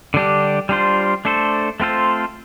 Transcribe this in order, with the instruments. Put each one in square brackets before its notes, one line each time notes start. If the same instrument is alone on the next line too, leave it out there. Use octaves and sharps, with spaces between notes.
[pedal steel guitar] D3 G3 D4 G4
G3 D4 F4 C5
A3 D4 A4 C5
A3 C4 F4 A4 C5